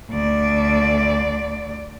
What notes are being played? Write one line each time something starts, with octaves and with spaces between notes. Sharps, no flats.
D2 D5